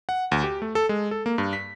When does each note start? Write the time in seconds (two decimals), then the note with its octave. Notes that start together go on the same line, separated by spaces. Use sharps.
0.09 F#5
0.32 D2
0.44 G4
0.62 A3
0.75 A4
0.89 G#3
1.11 A4
1.26 A#3
1.38 G2
1.53 B6